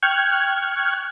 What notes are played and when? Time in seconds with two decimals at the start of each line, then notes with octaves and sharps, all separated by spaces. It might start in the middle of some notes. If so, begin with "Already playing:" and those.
0.03 G5 C#6 F6 F#6 G#6